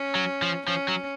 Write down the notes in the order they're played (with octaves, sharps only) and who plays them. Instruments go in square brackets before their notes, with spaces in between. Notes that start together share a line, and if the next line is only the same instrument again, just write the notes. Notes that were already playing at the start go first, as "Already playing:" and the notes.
Already playing: [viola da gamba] C#4
[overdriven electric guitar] F#3
F3
[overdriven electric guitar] F3 [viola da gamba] C#4
[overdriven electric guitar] F#3